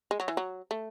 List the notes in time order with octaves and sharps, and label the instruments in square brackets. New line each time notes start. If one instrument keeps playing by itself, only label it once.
[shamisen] G#3
F#3
E3
F#3
A3